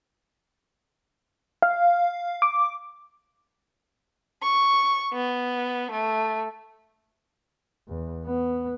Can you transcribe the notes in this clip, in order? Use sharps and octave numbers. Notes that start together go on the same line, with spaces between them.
F5
D6
C#6
B3
A3
E2
B3